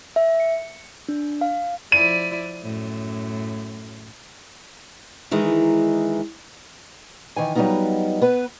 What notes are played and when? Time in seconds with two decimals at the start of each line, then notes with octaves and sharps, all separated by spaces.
0.16 E5
0.40 C#7
1.09 D4
1.41 F5
1.92 F3 E4 D5 D#7
2.63 F#2 A2
5.31 D#3 E3 G#3 D#4
7.36 D#3 E3 G#5
7.55 F#3 G3 A#3 B3 D#4 F4
8.22 B3 B4